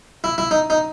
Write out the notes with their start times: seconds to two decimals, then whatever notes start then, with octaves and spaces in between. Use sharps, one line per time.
0.24 E4
0.38 E4
0.51 D#4
0.70 D#4